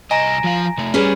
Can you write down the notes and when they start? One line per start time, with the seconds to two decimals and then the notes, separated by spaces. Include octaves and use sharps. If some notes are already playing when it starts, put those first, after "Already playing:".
0.11 C2 D#5 G#5 A#5 A#6
0.44 F3 F5
0.78 C3 A3
0.94 G3 C#4 G#4 B4